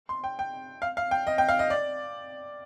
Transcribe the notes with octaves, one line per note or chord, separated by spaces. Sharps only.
C6
G5
G5
F5
F5
G5
D#5
G5
F5
D#5
D5